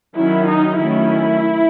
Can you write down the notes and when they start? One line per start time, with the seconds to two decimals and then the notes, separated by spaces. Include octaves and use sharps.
0.16 D#3 F#3 C#4 E4
0.47 D#4
0.78 D#3 F#3 A3 C#4 E4